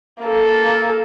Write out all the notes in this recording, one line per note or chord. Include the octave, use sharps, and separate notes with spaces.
A#3 A4